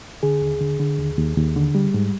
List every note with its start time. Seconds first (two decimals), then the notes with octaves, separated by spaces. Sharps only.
0.23 D3 G#4
0.42 D#2
0.60 D3
0.80 D3
0.99 D#2
1.18 D#2
1.37 D#2
1.56 D3
1.75 G3
1.94 G#2